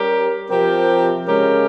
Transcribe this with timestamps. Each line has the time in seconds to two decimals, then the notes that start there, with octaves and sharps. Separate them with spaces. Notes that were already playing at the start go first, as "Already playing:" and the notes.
Already playing: G3 C#4 G4 A#4
0.50 C3 F3 C4 G4 A#4
1.27 C#3 G#3 C#4 G4 A#4